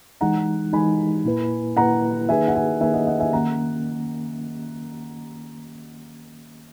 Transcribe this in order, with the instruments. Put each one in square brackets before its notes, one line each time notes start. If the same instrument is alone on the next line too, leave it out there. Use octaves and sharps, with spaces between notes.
[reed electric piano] E3 G#3 D#4 [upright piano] F#5 A#5
[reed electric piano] E3 G#3 D#4 [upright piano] G#5 B5
[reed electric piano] A#2 A#3 E4 B4
[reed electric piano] A#2 A#3 E4 B4 [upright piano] F#5 A#5
[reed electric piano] D#3 A#3 D#4 G#4 B4 [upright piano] E5 G#5
[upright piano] F#5
E5 G#5
[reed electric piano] D#3 A#3 D#4 G#4 B4 [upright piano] E5 G#5
[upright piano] D#5 F#5
D#5 F#5
E5 G#5
[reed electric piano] D#3 A#3 C#4 [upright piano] F#5 A#5